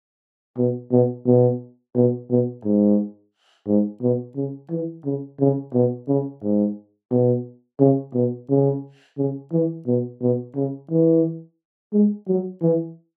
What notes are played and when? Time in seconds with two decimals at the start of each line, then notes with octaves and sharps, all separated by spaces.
0.57 B2
0.91 B2
1.26 B2
1.95 B2
2.30 B2
2.64 G#2
3.67 G#2
4.01 B2
4.36 C#3
4.70 E3
5.05 C#3
5.40 C#3
5.74 B2
6.08 C#3
6.43 G#2
7.11 B2
7.80 C#3
8.14 B2
8.49 C#3
9.18 C#3
9.53 E3
9.87 B2
10.22 B2
10.55 C#3
10.90 E3
11.93 G#3
12.28 F#3
12.62 E3